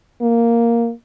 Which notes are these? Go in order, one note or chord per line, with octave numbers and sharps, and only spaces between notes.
A#3